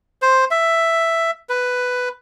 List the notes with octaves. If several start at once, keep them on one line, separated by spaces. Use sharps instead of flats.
C5
E5
B4